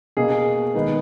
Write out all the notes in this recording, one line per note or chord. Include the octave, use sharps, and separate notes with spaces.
B2 A#3 G#4
D#3 G#3 B3